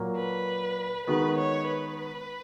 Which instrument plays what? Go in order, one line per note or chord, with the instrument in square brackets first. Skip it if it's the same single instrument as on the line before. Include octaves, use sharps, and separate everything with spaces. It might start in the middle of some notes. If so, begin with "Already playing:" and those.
Already playing: [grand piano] A#2 F#3 A#3
[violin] B4
[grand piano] D#3 G#3 B3 F#4 [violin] B4
[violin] C#5
B4